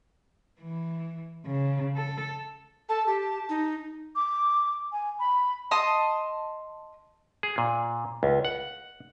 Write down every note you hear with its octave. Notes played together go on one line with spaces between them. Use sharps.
E3
C#3
A4
A4 A5
G4 A5
D#4
D6
G#5
B5
D#5 A5 C6 D#6
G#4
A#2
C#2
F#5